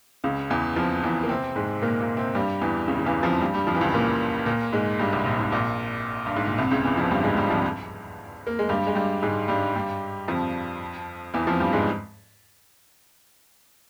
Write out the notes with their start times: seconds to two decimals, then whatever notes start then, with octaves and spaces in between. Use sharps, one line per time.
0.24 C#2 C#3
0.50 E2 E3
0.76 F2 F3
1.03 E2 E3
1.23 A#3
1.29 C3 C4
1.56 G#2 G#3
1.82 A#2 A#3
2.01 A#2 A#3
2.17 C3 C4
2.35 G2 G3
2.62 E2 E3
2.88 C#2 C#3
2.99 C#3
3.06 E2 E3
3.23 F2 F3
3.40 G2 G3
3.54 G2 G3
3.67 F2 F3
3.75 E3
3.80 C#2 C#3
3.94 A#2 A#3
4.46 A#2 A#3
4.72 G#2 G#3
4.99 G2 G3
5.13 C2 C3
5.26 A#1 A#2
5.39 G#2
5.52 A#1 A#2
6.26 G2
6.36 G#2
6.47 A#2
6.58 C2 C3
6.71 C#2 C#3
6.85 E2 E3
6.97 F2 F3
7.11 G2 G3
7.23 G#2 G#3
7.37 G2 G3
7.50 F2 F3
8.47 A#3
8.59 G#3
8.69 G2 G3
8.87 G#3
8.95 G2 G3
9.23 G#2 G#3
9.48 G2 G3
9.76 G2 G3
10.28 F2 F3
11.34 E2 E3
11.47 F2 F3
11.60 G2 G3
11.73 G#2 G#3